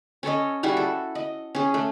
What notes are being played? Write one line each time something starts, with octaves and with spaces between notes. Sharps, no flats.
C#4 A4 C#5 D#5
G3 E4 F#4 G#4
A4
D#5
C#4 G#4
A3